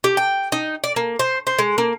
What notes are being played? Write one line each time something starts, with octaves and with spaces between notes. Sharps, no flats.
G4
G5
D#4
D5
A#3
C5
C5
G#3
A#3